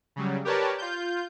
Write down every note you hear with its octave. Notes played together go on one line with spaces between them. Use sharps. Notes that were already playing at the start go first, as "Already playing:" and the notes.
C#3 F#3 G3
G4 A#4 B4 C#5 D5 A5
F4 G6